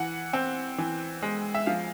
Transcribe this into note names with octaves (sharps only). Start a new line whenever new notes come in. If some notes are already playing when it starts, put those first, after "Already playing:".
Already playing: E3 F#5
C4
E3
G#3
E5
F3 F5